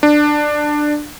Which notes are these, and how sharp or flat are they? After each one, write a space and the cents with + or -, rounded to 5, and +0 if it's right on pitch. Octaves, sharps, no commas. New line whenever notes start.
D4 +15